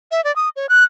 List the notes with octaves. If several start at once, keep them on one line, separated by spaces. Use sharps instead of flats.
E5
D5
D#6
C#5
F#6